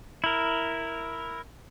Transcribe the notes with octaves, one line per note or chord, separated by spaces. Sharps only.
E4 A#4